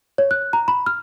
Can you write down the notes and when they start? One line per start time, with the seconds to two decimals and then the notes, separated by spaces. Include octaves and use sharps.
0.18 C#5
0.31 F#6
0.53 A#5
0.68 B5
0.86 F6